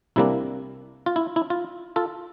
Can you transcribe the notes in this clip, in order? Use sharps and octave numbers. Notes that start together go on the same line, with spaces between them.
C2 C3 G3 A#3 D4 E4
F4
E4
E4
F4
F4 A4